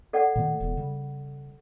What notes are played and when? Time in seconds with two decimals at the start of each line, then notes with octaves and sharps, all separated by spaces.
0.13 A4 D5 F#5
0.35 A#2 D#3 A3
0.60 E1 E2
0.77 C#3 G3